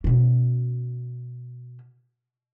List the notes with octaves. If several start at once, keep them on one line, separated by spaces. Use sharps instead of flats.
B2 C#4